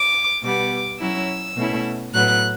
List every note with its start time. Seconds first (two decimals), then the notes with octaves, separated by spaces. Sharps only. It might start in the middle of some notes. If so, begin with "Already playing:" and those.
Already playing: D6
0.43 B2 G3 B3 D6
0.99 F#3 C#4 E4 E6
1.56 B2 A3 C#4 E4
2.13 A2 F#3 B3 F#6